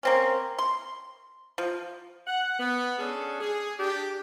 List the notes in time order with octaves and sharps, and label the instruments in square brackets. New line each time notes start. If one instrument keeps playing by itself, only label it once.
[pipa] A#3 C4 C#4
C6
F3
[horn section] F#5
B3
C#4 D4 G#4 A4
G#4
D4 G4